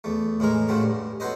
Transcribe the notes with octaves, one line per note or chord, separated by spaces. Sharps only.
E2 A3
A2 E3 G#3 A#4
A2 C#3 F#3 A3 C4
G2
F#3 B3 A4 B4 C5 D#5